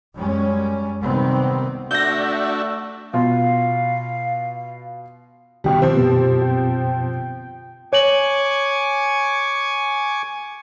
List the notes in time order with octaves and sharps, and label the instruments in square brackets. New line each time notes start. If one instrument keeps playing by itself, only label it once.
[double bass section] F#2 G3 G#3 C#4
C3 D#3 G3 B3 C4
[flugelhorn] A3 [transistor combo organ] D4 F#4 E5 [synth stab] G6 A#6
[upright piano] B2 F4 [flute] F5
[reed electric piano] C2 D#3 G5 [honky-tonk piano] G2 B2 G3 [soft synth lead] G4
[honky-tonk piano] F3 C4 [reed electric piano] C5
[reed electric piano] F#2 B2 B3
[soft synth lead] G5
[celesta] C#5 F#7 [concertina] G#5 C#6 D6